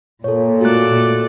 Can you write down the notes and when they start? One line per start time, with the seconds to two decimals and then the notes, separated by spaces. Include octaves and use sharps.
0.24 A#2 A4 C#5
0.61 A3 F#4 A4 D5 F#6